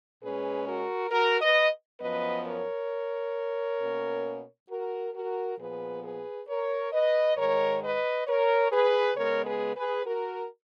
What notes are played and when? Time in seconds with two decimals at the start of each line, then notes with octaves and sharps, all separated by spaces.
0.21 A#2 G#3 C#4 G#4 B4
0.67 F#4 A#4
1.11 F#4 A#4
1.41 B4 D#5
2.00 F#2 F3 B3 B4 D#5
2.45 A#4 C#5
3.79 B2 A#3 C#4
4.68 F#4 A#4
5.14 F#4 A#4
5.58 A#2 F3 B3 G#4 B4
6.02 G#4 B4
6.48 A#4 C#5
6.92 B4 D#5
7.36 G#2 D#3 G#3 A#4 C#5
7.81 B4 D#5
8.26 A#4 C#5
8.71 G#4 B4
9.16 C#3 G#3 B3 A#4 C#5
9.46 G#4 B4
9.75 G#4 B4
10.05 F#4 A#4